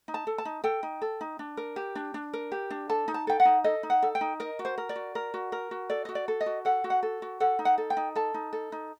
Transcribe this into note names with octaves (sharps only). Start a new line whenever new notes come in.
D#4
A5
A4
A5
D#4
A4 G5
D#4
A4
D#4
D4
A#4
G4
D4
D4
A#4
G4
D4
A4 A5
D#4
A5
A4 G5
F#5
D#4
A4 D#5
D#4
F#5
A4
G5
D#4
A#4 D#5
F#4
C5
A#4
D5
F#4
A#4
F#4
A#4
F#4
A4 D5
F#4 D#5
D5
A4
D#5
F#4
A4 F#5
F#4
F#5
A4
F#4
A4 F#5
D#4
F#5
A4
G5
D#4
A4 A5
D#4
A4
D#4